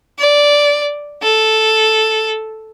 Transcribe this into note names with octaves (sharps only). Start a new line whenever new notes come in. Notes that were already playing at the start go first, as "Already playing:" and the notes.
D5
A4